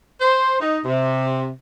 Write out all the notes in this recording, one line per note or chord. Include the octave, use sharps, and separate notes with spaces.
C5
D#4
C3